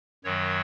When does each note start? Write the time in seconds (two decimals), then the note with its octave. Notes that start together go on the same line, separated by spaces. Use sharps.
0.24 F#2 D#3 F#3 C#5